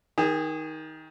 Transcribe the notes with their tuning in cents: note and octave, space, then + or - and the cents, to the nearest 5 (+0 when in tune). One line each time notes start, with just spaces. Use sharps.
D#3 +15 G#4 -25